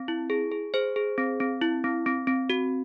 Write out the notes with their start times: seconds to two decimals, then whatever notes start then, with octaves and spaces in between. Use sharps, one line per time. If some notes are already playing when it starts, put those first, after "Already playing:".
Already playing: C4
0.08 E4
0.30 G#4
0.52 G#4
0.74 G#4 C5
0.96 G#4
1.18 C4
1.40 C4
1.61 E4
1.84 C4
2.06 C4
2.27 C4
2.50 F#4